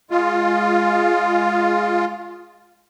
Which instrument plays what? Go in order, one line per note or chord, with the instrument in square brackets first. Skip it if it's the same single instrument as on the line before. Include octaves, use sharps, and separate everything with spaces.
[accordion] G#3 F4